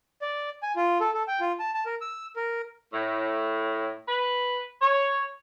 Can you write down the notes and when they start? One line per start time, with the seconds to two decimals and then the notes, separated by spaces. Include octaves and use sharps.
0.22 D5
0.63 G#5
0.76 F4
1.00 A4
1.14 A4
1.28 G5
1.41 F4
1.60 A5
1.74 A5
1.86 A#4
2.01 E6
2.36 A#4
2.93 A2
4.08 B4
4.81 C#5